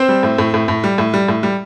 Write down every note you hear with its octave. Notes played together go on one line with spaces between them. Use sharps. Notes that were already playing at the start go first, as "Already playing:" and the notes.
Already playing: C4 C5
G3
A2
A2
A2
A2
G3
A2
G3
A2
G3